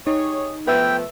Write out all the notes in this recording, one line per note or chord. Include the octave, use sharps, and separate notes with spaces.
D#4 G4 G#4 C#5
F3 A3 B3 B4 E5 G5 E6